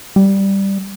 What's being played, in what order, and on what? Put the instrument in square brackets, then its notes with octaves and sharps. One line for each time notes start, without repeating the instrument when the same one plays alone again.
[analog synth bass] G3